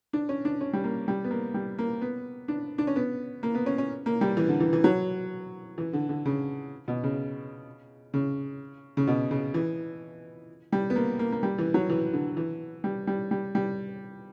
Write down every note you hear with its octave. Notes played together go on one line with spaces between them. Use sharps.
D4
C#4
D4
C#4
G3
A#3
G3
B3
A#3
G3
A#3
B3
D4
D4
C#4
B3
A#3
B3
C#4
C#4
A#3
G3
E3
D3
E3
E3
F#3
E3
D3
D3
C#3
B2
C#3
C#3
C#3
B2
C#3
E3
G3
B3
A#3
A#3
A#3
G3
E3
F#3
E3
D3
E3
G3
G3
G3
G3